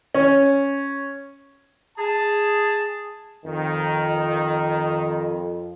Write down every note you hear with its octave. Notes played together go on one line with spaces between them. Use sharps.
C#4
G#4 A5
F2 D#3